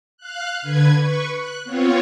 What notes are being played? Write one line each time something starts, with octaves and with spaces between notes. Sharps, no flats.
F5 F#6
D3 B4 G#6
B4 C#6
F#6
B3 C4 F4 C#5